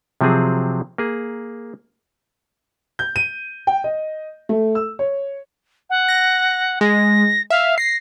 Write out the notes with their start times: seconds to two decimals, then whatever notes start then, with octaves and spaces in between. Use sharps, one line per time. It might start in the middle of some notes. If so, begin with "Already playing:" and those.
0.21 C3 F3 F#3 C4 G#4
0.98 A#3 G#4
2.99 G6
3.16 D#7
3.67 G5
3.84 D#5
4.49 A3
4.75 E6
4.99 C#5
5.90 F#5
6.09 A#6
6.81 G#3 A#6
7.50 E5 F5
7.78 A#6 C7